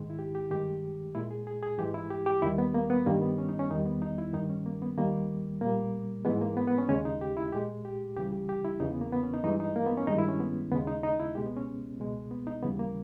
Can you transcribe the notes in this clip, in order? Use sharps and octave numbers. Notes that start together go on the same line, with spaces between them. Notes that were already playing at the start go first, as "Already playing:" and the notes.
Already playing: G#2 D#3 G#3
E4
G4
G4
G2 D#3 G#3 G4
A#2 G#3 E4
G#4
G#4
G#4
G#2 E3 G#3 G4
E4
G4
G4
D#2 D#3 G3 E4
B3
A#3
B3
G2 D#3 G3 A#3
B3
C#4
D#4
C#4
E2 D#3 G3 D#4
B3
D#4
E4
G2 D#3 G3 D#4
C#4
A#3
B3
D#2 D#3 G3 A#3
A#2 G3 A#3
G#2 E3 G#3 B3
A#3
B3
B3
C#4
D#2 C#3 G#3 C#4
D#4
G4
E4
A#2 G#3 G4
G4
C#2 C#3 E3 G3 G4
G4
G4
E4
E2 C#3 E3 D#4
B3
A#3
B3
C#4
D#4
G2 E3 G#3 D#4
D#4
A#3
B3
C#4
G2 D#3 G#3 D#4
E4
C#4
B3
D#2 C#3 G#3 B3
D#4
D#4
E4
C#2 B2 G#3 G4
B3
C#4
C#2 B2 G#3
B3
D#4
D#2 C#3 E3 G3 B3
A#3